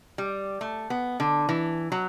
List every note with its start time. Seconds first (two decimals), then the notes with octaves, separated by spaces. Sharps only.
0.18 G3
0.61 A3
0.90 B3
1.20 D3
1.49 E3
1.92 F#3